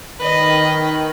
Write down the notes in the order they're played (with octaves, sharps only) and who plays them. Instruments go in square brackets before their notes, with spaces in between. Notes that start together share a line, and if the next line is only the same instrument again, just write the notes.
[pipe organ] D#3 [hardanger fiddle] B4 D#5